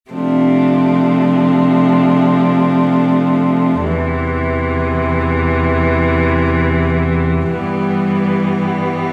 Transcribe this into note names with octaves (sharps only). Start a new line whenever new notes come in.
C3 F3 A3 D4
E2 C3 E3
G2 E3 G3 B3